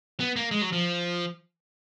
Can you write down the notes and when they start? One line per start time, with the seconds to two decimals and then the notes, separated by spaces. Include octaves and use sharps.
0.20 B3
0.36 A#3
0.51 G#3
0.62 F#3
0.73 F3